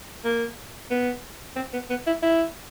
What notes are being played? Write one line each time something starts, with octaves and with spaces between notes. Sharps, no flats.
A#3
B3
C4
B3
B3
E4
E4